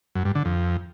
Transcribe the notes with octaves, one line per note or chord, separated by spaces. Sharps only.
F#2
G2
D3
F2